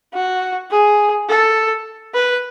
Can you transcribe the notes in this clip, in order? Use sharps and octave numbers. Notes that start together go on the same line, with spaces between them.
F#4
G#4
A4
B4